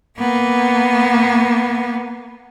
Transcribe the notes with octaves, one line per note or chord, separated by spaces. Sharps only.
A#3 B3